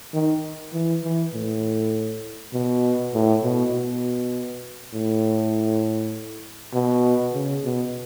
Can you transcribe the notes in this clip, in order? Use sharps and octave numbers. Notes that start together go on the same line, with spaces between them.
D#3
E3
E3
A2
B2
A2
B2
B2
A2
B2
C#3
B2